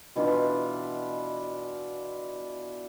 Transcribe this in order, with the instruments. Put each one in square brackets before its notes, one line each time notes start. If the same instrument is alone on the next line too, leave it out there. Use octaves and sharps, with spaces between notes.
[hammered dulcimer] B2 E3 D4 F4